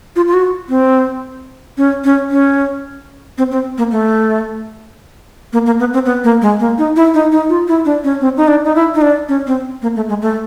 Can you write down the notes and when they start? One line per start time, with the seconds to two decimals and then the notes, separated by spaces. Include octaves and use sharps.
0.16 F4
0.27 F4
0.33 F#4
0.69 C4
1.77 C#4
2.04 C#4
2.31 C#4
3.38 C4
3.51 C4
3.78 A#3
3.91 A3
5.53 A#3
5.66 A#3
5.80 B3
5.94 C4
6.06 B3
6.24 A#3
6.42 G#3
6.60 A#3
6.78 D#4
6.96 E4
7.14 D#4
7.32 D#4
7.49 F4
7.68 E4
7.85 D4
8.04 C#4
8.21 C4
8.37 D#4
8.48 D4
8.65 D#4
8.75 E4
8.94 D#4
9.02 D4
9.29 C#4
9.47 C4
9.82 A#3
9.96 A3
10.09 G#3
10.22 A3